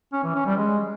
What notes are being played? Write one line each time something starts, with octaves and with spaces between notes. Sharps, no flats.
C#4
E3
C#4
G3
G#3